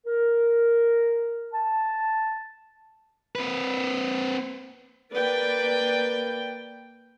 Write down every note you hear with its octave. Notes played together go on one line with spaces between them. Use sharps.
A#4
A5
C4 B4
A#3 B4 D5 G5